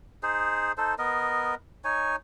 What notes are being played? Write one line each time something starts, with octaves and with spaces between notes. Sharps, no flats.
D#4 G#4 C5
D#4 A4 C5
B3 A#4 D#5
D#4 C#5 G#5